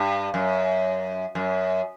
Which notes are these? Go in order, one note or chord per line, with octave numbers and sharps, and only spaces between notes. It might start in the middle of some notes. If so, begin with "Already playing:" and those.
Already playing: G2
F#2
F#2